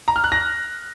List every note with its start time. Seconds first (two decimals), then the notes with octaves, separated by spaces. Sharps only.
0.08 A#5
0.16 F6
0.24 F#6
0.32 A#6